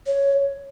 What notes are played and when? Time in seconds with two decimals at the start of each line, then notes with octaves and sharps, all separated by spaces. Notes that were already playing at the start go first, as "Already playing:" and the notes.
0.06 C#5